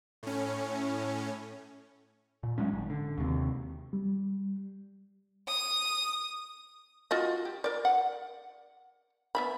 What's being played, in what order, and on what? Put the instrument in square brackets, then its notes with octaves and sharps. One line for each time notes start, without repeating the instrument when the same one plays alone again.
[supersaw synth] A2 C#4
[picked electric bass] A#2
F#3 G#3 C#4
G#1
D3
D#2 C3
[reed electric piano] G3
[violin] D#6
[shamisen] F4 F#4 D#5
G4
A#4 D5
F#5
B3 E5 B5